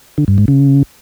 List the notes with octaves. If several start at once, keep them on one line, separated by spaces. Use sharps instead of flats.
D3
G2
G#2
C#3